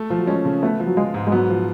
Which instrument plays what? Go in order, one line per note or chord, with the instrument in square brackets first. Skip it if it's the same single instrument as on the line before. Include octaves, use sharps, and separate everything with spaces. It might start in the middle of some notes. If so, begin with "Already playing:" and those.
Already playing: [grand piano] A3
F3
[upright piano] F#3
[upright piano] G#3 [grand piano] C#4
[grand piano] C#3
[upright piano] A3 [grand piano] B3
[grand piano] F3
[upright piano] F#3
[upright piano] G#3 [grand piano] F4
[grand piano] G#2
[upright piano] G#3
[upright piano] F#3 [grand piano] B3
[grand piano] F3